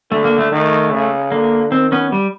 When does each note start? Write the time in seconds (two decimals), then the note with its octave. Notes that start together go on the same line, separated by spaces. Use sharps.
0.11 D3 A3
0.25 A#3
0.38 A3
0.52 D#3 A3
0.92 C#3
1.31 D3 A#3
1.72 D#3 C4
1.92 B3 C#4
2.12 G3